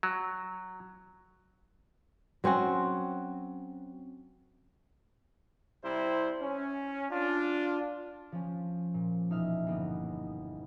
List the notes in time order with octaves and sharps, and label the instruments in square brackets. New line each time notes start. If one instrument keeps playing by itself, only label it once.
[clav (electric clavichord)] F#3
[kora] F#3 C4 C#4 F#4
[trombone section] C3 G3 E4 C5
C#4
D4 F4
[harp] F3 C#4
A#2
E1 D#4 E5 F6
G1 A#3 B3